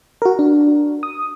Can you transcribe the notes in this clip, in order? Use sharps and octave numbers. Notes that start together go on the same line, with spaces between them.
F#4 A#4
D4
D#6